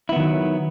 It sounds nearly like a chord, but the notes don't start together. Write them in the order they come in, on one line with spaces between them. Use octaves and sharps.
E4 B3 D#3 F#3